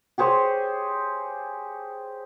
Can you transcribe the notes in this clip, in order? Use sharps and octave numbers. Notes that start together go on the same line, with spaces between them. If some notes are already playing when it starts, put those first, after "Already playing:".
G4 G#4 C5 C#5